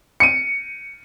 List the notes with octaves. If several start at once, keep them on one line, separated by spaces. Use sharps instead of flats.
C#7 D#7